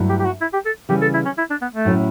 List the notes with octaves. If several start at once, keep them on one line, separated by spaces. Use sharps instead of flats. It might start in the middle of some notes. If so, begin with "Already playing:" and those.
Already playing: G2 F#3 A3 E4
G4
G4
F#4
E4
G4
A4
C#3 E3 G3 G4
A4
E4
C#4
E4
D4
B3
A3
A2 F#3 C#4 E4